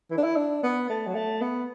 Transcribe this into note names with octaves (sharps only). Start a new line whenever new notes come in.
E3
D4
E4
D4
B3
A3
F#3
A3
B3